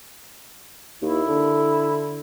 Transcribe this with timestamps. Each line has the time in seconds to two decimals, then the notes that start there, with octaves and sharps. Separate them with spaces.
1.02 D#2 E4
1.28 D3